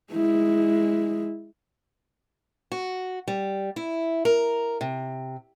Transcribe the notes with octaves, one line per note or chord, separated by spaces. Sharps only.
G#3 E4
F#4
G3
E4
A#4
C3